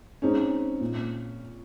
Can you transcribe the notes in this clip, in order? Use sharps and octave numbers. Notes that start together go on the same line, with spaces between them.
G#3 C4 C#4 D#4
A#2